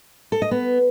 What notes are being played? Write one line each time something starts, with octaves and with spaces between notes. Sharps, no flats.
A4
D#5
B3